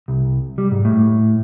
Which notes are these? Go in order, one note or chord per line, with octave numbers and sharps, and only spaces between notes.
C2
G3
G#2
A2